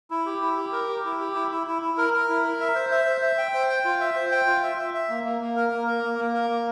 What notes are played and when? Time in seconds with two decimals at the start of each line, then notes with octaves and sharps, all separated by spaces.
0.10 E4
0.26 G4
0.42 E4
0.57 G4
0.72 A#4
0.88 G4
1.04 E4
1.20 G4
1.35 E4
1.51 E4
1.67 E4
1.82 E4
1.98 A#4
2.13 A#4
2.29 E4
2.44 A#4
2.60 E5
2.75 C5
2.92 E5
3.06 C5
3.22 E5
3.38 G5
3.54 C5
3.69 G5
3.85 F4
4.00 E5
4.16 C5
4.31 G5
4.47 F4
4.63 E5
4.78 E5
4.94 E5
5.09 A#3
5.25 A#3
5.41 A#3
5.56 A#4
5.72 A#3
5.87 A#4
6.03 A#3
6.19 A#3
6.34 A#4
6.50 A#3